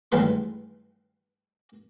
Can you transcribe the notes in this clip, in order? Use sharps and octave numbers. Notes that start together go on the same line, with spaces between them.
A1 G2 D#3 G#3 B4 C6